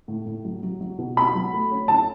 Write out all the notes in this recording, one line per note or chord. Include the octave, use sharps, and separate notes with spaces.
A2
A2
F#3
F#3
F#3
B2
B2 B5
F#3
A3
C#4
C#4 A5